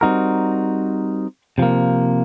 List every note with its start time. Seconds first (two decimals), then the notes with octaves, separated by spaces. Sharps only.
0.01 G3 C4 D#4 F#4 A#4
1.58 C3 F3 A#3